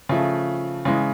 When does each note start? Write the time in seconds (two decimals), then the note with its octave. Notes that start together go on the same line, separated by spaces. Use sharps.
0.09 C#3 F3 A3
0.85 C#3 E3 G#3